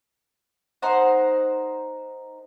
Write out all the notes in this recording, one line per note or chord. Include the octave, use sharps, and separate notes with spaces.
D#4 A#4 C5 F#5